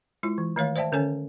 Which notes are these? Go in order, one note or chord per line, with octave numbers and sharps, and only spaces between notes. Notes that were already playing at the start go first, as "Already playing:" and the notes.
G#3 E4 F4
E3
D#3 A3 C#5 F5
C5 D5 E5 G5 A5
D3 C#4 A4 C#5 G#5